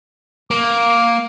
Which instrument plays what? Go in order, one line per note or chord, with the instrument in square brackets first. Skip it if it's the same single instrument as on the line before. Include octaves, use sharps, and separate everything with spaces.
[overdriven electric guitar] A#3 [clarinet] D6